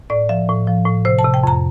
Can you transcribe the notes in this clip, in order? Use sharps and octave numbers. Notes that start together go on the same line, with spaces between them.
A2 D5
F3 E5
A2
F3
A2
C3 C5
A5
C3
G5
F2 A#5